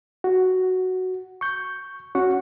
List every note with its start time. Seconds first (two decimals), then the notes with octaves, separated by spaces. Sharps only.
0.24 F#4
1.41 C#6 G6
2.15 C#4 F#4 F#5 C#6